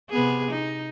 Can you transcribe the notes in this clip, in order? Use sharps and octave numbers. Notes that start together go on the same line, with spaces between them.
C3 B3 G#4
D#4